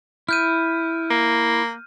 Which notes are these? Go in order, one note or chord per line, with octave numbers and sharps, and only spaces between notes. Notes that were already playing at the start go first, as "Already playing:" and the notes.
E4 F6 G6 D#7
A#3